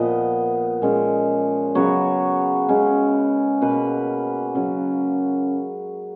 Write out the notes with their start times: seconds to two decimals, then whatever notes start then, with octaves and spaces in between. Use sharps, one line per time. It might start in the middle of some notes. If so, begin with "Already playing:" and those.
Already playing: A#2 F3 B3 D#5
0.82 A#2 G#3 C#4
1.75 C#3 F#3 B3 C#5
2.69 C#3 G#3 C#4
3.61 B2 A#3 C#4 B4
4.55 C#3 F#3 C#4